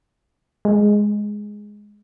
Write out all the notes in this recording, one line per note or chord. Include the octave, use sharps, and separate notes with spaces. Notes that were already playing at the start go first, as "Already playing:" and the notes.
G#3